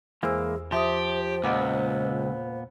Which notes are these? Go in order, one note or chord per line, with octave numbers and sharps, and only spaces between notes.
E2 E3 G#3 A#3 G#4 C5 E6
F3 G4 C5 E5 C6 D#6
C#2 A#2 B3 D#5 F#5 D6